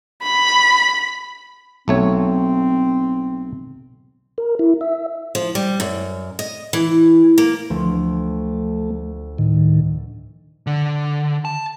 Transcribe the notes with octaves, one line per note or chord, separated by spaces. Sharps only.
B5
B1 A3 C4 C#5
A#4
E4
E5
F3
G3
F#2
D#5
E3
A#3
D2 F3 A3
A2 D#3
D3
A5